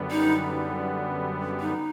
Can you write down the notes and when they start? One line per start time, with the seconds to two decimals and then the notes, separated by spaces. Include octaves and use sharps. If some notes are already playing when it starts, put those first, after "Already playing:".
Already playing: F#2 D3 G3 B3
0.11 D#4
1.60 D#4